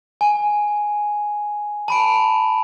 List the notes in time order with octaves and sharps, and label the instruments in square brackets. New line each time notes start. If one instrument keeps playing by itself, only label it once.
[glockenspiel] G#5
A5 B5 D7